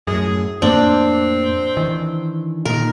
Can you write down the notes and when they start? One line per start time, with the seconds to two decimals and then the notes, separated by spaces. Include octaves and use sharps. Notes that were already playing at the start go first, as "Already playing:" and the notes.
0.07 F#2 A2 G#4
0.62 F2 A2 A#3 C4 D4
1.77 D#3 E3
2.65 A#2 D#3 A#4